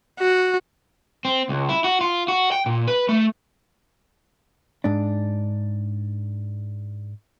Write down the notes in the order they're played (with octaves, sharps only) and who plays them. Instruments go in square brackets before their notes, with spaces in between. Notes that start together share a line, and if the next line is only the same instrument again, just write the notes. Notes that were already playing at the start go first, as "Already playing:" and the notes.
[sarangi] F#4
[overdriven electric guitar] C4
C#2
E4
F#4
F4
F#4
G5
A#2
B4
A3
[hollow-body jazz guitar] G#2 D4